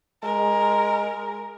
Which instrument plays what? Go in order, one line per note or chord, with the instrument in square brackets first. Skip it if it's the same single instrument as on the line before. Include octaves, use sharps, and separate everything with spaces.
[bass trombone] G#3 [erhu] A#4